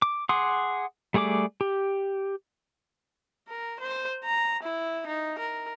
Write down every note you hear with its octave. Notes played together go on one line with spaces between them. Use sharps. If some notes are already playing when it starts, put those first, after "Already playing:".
D6
G#4 F#5 C6 D6 D#6
G3 A3 G#4 D5 D6
G4
A#4
C5
A#5
E4
D#4
A#4